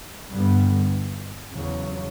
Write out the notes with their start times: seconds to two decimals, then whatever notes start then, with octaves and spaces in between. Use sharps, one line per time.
0.31 G2 D3 G3 B3
1.51 E2 C#3 F#3